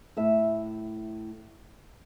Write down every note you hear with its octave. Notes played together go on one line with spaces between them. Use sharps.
A2 E5